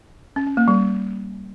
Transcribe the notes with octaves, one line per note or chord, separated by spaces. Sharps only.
C#4
C#4
A#3
G3